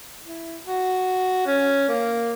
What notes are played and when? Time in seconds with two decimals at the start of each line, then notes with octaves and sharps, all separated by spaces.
0.24 E4
0.65 F#4
1.46 C#4
1.88 A#3